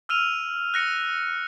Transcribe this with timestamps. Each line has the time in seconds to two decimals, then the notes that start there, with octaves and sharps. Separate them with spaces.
0.09 E6 F6 D#7 F7
0.74 F#6 A#6 C#7